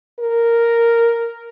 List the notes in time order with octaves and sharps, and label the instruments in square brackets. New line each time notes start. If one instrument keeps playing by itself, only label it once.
[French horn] A#4